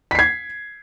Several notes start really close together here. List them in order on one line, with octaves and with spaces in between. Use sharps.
B6 C7 G#6